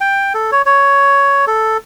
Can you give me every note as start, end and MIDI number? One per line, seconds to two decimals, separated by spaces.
0.01 0.33 79
0.34 0.51 69
0.52 0.62 73
0.66 1.45 73
1.47 1.77 69